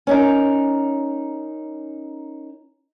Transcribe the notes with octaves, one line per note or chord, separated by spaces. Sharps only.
C#4 D#4 A#4